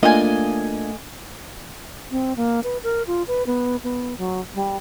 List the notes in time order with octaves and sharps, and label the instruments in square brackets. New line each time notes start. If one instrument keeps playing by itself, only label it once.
[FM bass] A3 [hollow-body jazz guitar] A#3 D4 F4 [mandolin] D#5 G#5
[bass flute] C4
A#3
B4
A#4
F4
B4
B3
B3
F#3
G3